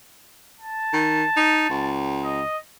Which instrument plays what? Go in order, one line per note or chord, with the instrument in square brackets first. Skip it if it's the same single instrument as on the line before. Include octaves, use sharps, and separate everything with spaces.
[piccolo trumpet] A5
[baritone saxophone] D#3
D#4
C#2
[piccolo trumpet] D#5